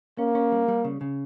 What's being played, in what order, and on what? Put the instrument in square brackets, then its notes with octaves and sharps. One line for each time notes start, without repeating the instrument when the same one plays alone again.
[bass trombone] A#3 [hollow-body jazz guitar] C#4
[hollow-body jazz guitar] C#4
G3
G3
C#3
C#3